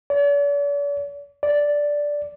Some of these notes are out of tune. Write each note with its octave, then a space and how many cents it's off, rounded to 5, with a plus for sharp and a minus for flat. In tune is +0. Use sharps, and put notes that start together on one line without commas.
D5 -45
D5 -5